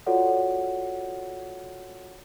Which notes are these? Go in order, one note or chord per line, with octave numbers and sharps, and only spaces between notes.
F4 F#4 A4 C#5 D5 F#5